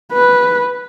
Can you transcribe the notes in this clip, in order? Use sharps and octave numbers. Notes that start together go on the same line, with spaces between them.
B4